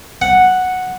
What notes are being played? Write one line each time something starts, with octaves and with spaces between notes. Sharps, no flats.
F#5